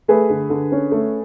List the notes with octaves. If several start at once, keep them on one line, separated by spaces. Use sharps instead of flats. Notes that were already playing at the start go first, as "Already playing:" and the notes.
A3 G#4 B4
D3
D3
C#4
A3